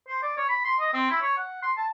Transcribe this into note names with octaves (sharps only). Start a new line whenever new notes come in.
C5
D5
C#5
B5
C6
D#5
C4
E4
C#5
F#5
C6
A5